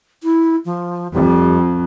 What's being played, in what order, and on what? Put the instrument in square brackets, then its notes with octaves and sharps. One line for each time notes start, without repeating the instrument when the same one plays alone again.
[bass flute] E4
F3
[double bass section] F2 [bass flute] G3